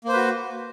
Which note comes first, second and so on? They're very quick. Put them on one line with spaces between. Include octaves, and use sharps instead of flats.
A#3 C5 B4 F#4